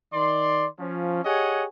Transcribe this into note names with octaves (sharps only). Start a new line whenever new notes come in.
D#3 D5 C6
F3 C#4
G4 G#4 C#5 D#5 F#5 G#5